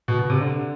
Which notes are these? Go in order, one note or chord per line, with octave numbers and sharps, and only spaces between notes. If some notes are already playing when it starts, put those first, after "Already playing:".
B2
B2
C3
D3